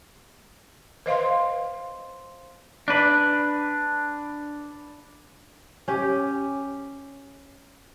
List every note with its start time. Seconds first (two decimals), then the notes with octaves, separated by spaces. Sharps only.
1.06 B4 C5 D#5 F5 C6
2.88 D4 B4
5.88 C#4 G4